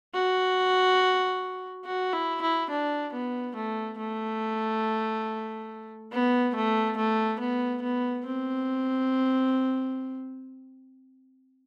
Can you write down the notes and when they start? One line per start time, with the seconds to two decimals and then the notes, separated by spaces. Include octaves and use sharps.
0.14 F#4
1.85 F#4
2.13 E4
2.42 E4
2.70 D4
3.13 B3
3.55 A3
3.98 A3
6.12 B3
6.55 A3
6.97 A3
7.40 B3
7.82 B3
8.25 C4